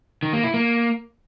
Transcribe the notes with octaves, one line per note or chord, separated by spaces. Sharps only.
D#3
A#3
E4
A#3